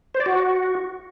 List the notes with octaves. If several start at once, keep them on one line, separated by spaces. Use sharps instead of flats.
C5
D5
F#4